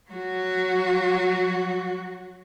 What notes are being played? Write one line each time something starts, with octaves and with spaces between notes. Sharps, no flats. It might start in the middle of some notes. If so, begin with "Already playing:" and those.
F#3 F#4